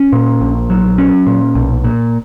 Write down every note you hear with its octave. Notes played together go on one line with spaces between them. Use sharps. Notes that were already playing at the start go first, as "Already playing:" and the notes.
Already playing: C#4
A#2
A#1
F#3
C#4
A#2
B1
A#2